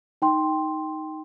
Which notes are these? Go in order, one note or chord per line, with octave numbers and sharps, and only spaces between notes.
D#4 G5 C6